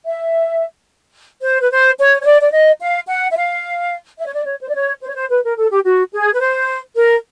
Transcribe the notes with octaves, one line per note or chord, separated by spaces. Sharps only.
E5
C5
B4
C5
C#5
C#5
D5
D5
D#5
F5
F#5
E5
F5
E5
C#5
D5
C#5
C5
D5
C#5
C5
C#5
C5
B4
A#4
A4
G4
F#4
G#4
B4
C5
A#4